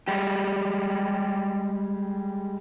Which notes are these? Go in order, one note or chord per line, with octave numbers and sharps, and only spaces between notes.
G3 G#3 G4